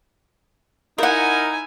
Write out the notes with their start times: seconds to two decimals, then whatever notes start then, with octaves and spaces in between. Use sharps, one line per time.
0.98 D#4 E4 A#4 F#5 G#5